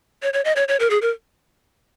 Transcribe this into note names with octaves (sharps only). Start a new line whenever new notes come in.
C#5
C#5
D#5
C#5
C#5
A#4
G#4
A#4